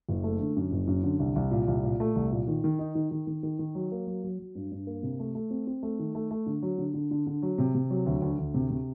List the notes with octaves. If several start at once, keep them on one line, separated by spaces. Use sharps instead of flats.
F#1
A3
D3
F#2
F#1
F#2
D3
C2
C2
A#2
C2
A#2
A3
C2
A#2
D#3
D#3
D#4
D#3
D#3
D#3
D#3
D#3
F#3
A#3
F#3
F#3
F#3
G2
G2
A#3
C3
A3
A3
C4
C4
A3
D#3
A3
A3
D3
F#3
D3
D3
D3
D3
F#3
C3
C3
F#3
D2
D2
D2
C3
C3